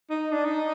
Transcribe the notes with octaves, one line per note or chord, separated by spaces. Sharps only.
D#4
D4
D#4